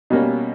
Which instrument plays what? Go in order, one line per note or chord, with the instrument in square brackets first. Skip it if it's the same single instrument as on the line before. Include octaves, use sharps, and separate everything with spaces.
[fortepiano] B2 G3 A#3 C#4